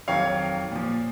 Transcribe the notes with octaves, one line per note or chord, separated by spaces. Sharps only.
F2 D#3 F#3 C#5 F5
A#2 F3